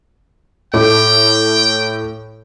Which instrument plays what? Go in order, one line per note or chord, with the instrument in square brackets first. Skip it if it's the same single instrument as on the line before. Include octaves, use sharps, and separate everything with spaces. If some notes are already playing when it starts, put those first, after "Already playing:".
[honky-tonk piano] A2 A3 D6 [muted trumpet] G5